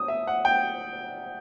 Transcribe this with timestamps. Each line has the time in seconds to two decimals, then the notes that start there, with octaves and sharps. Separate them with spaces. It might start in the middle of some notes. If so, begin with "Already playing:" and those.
Already playing: D#6
0.08 E5
0.27 F#5
0.45 G5